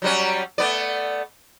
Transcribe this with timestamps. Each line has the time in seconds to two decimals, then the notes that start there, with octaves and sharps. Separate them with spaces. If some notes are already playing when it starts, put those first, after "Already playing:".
0.02 F#3 G3 C#4
0.58 A3 B3 D5